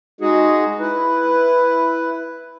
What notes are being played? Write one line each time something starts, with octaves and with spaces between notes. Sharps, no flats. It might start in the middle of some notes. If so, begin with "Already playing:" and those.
G#3 D#4 F#4 G#4
E4 B4